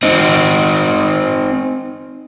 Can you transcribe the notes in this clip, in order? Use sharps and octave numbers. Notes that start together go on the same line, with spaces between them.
C4 D#4